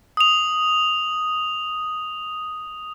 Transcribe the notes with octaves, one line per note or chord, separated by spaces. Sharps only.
D#6 F7